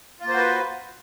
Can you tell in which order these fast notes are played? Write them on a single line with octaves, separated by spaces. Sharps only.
F4 A#3 C5 F#4 B4